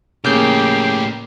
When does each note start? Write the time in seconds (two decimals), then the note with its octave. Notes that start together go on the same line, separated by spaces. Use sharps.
0.24 A2 C#3 A#3 G4 D6 G6 C7